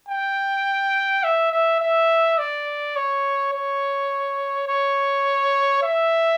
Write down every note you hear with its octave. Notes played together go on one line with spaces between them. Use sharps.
G5
E5
E5
E5
D5
C#5
C#5
C#5
E5